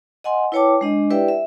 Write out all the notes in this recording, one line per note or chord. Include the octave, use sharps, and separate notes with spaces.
D#5 F#5 G#5 C6
E4 B4 C#5 G5 A5 D6
G#3 D4 D#5
E4 G4 B4 D5 E5 G5
E5